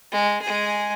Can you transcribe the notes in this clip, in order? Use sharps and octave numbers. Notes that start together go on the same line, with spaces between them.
G#3
G#3 G#4